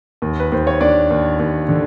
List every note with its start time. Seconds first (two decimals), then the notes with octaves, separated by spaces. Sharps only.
0.22 D#2
0.39 B4
0.52 D#2 C5
0.67 C#5
0.80 D#2 D4 D5
1.10 D#2
1.39 D#2
1.69 D3